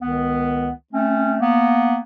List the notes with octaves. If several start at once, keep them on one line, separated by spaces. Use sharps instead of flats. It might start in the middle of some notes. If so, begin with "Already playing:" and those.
C#2 D#3 B3
A3 C4 C#4
A#3 B3